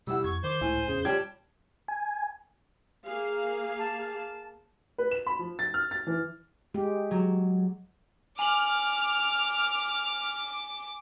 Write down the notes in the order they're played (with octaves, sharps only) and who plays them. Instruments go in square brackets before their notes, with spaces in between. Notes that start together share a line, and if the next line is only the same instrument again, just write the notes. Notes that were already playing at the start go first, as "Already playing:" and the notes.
[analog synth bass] C3 [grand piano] G3 E4 F#5 [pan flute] E6
[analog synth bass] F2 [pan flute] C#6 [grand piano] G#6
[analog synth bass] D#3 [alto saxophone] C5 [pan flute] D6
[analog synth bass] C#2 [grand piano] A2 [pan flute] G#5
[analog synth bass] E2 [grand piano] C#3 [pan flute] G#4
[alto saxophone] G3 [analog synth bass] F4 [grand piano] C#5 G5 G#6 [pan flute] A5
[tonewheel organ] G#5
[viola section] A#3 G#4 F5
[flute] A5
[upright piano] B4
E7
B5
F3
A6
F6
A6
E3
[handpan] G#3 G4
[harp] F#3
[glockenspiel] G#5 F#7 [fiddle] D6 [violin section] F6